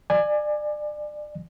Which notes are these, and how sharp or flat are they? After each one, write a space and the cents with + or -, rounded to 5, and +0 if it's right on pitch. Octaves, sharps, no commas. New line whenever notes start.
D5 +30 G#5 +0